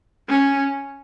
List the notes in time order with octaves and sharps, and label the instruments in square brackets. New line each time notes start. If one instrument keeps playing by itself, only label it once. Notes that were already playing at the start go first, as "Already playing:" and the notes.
[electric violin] C#4